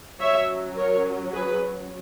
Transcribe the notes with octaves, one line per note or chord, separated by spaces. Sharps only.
F#3 C#4 C#5 E5
A#4 C#5
G#4 B4